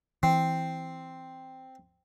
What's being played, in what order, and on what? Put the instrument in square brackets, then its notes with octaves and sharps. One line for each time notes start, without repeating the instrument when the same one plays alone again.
[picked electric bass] E3 [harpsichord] C4